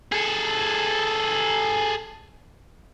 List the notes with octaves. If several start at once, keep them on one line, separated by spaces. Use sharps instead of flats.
G#4 A4